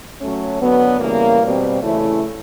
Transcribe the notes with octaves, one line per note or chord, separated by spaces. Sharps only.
F#3 A3 C#4
D3 F#3 B3
C#3 E3 G3 A#3
B2 G3 C4
C#3 E3 A3 C#4 E4